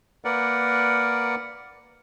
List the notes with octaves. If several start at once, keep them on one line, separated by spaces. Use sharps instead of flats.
A#3 A#4 B4 D5 F#5